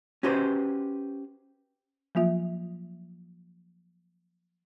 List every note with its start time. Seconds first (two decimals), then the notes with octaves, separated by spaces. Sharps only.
0.23 C#4 F#4 G4 B4 C5
2.15 F3 F#3 A#3 F4 E5